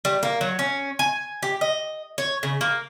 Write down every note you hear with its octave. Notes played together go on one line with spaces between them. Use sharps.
G3
A#3
F#3
C#4
G#5
G4
D#5
C#5
C#3
A#3